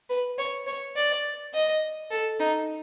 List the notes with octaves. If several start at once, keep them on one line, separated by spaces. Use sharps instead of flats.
B4
C#5
C#5
D5
D#5
A4
D#4